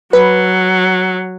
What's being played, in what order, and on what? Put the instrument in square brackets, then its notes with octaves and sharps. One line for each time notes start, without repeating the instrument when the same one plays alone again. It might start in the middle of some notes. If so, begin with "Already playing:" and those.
[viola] F#3 [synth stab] B4